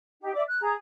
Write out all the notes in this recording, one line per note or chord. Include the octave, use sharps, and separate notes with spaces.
D#4 G4
D5 E5 D6
F#6
G#4 A#5